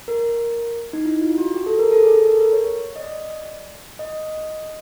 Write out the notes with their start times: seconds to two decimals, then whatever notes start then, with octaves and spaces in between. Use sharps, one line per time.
0.08 A#4
0.93 D#4
1.05 E4
1.21 F4
1.38 F#4
1.54 G4
1.66 A4
1.79 A#4
1.91 A4
2.03 G#4
2.16 A4
2.27 A#4
2.41 A#4
2.53 C#5
2.96 D#5
3.01 D5
3.99 D#5